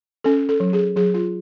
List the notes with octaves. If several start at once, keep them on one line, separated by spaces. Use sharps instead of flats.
C#4 A4
A4
F#3
G#4
F#3 G#4
F4